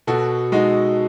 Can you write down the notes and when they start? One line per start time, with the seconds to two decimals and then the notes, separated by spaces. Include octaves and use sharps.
0.07 B2 F#4 A4
0.52 G#3 D#4 F#4